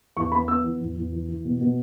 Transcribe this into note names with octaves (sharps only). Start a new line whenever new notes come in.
E2 C#6
B3 B5
B3 E6
E3
E2
E2
E3
E3
B2
B2